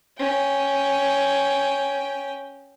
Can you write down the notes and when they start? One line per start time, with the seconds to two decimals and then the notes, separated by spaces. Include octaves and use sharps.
0.19 C#4 G5